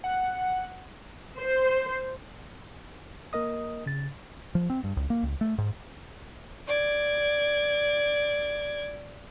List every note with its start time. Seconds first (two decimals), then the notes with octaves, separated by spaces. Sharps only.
0.04 F#5
1.38 C5
3.33 A#3 A#4 D#5 D#6
3.86 C#3 A6
4.55 F3
4.70 C4
4.84 G2
4.97 C#2
5.10 A#3
5.23 C#2
5.41 A3
5.58 G#2
6.68 D5 G#6